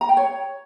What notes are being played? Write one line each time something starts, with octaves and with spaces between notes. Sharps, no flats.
A#5
G5
C#5